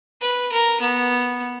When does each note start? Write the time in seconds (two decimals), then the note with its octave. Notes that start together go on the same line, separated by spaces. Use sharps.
0.21 B4
0.52 A#4
0.80 B3